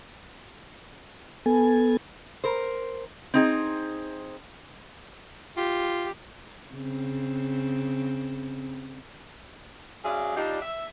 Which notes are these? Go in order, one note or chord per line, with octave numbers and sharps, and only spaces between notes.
B3 A4 G#5
A#4 C5
C4 D#4 G#4
F4 G4
C#3 C4
F#3 C#4 G#4 D5 E5 F5
G3 D4 D#4 F4 G4
E5